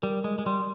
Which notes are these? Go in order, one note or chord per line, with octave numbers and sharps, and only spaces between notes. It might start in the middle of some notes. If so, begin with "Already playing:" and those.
G3 A#4
G#3 D#5
G#3
G3 C6